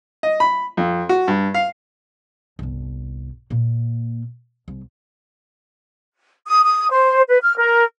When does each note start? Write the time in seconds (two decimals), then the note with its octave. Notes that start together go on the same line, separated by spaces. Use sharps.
0.23 D#5
0.40 B5
0.77 F2
1.09 F#4
1.28 G2
1.54 F5
2.59 G1 C2
3.50 A#2 A#3
4.68 C2
6.47 D#6
6.63 D#6
6.91 C5
7.28 B4
7.42 F6
7.57 A#4